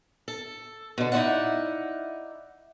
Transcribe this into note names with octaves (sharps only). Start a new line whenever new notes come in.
A4
B2 D3
D#4 E4 F#4 D5 E5 F#5